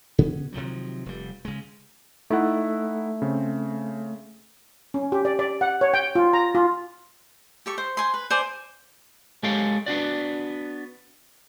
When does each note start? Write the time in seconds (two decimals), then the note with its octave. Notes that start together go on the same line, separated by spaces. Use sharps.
0.18 C#3 B3 C#4
0.53 C3 D#3 F3 F#3
1.06 F1 G3
1.45 C#3 G#3
2.30 A3 D#4 E4 F#5
3.22 C#3 C4
4.94 C#4
5.12 G4
5.25 D5
5.39 D5
5.61 F#5
5.81 C#5
5.94 G5
6.15 F4
6.33 A#5
6.55 F4
7.66 G4 A4 C#6
7.78 C5
7.97 C5 G#5 C6
8.14 B4
8.31 C5 D5 G#5 D6
9.43 G#3 G4 A4 C#5 F5 G5
9.86 B3 D4 F#4 D5